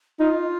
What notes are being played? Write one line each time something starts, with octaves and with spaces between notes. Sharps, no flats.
D#4 F4